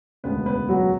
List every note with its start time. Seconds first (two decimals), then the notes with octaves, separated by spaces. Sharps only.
0.24 E1 D2 C#3 B3 B4
0.46 B3 B4
0.69 F#3 F#4